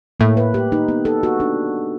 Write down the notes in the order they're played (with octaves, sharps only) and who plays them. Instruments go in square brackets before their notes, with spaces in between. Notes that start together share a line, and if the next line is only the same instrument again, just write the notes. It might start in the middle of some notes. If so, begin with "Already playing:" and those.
[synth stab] A2 A3 [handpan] A#3
[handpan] B4
G4
D#4
B3
A4
F#4
D4